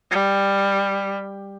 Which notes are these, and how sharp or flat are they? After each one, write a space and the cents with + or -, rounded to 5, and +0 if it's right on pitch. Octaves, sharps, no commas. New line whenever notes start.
G3 +10